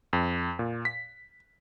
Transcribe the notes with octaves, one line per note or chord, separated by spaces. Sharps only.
F2
A#2
B6